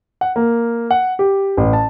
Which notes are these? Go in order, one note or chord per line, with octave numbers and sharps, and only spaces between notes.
F#5
A#3
F#5
G4
A1
A5